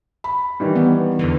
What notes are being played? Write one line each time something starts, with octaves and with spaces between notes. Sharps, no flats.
B5
D#3 E3 G3
B3
E2 D3 E3